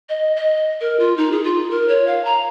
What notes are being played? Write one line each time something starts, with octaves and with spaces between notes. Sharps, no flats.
D#5
D#5
A#4
F4
D#4
G#4
F4
A#4
C#5
F5
A#5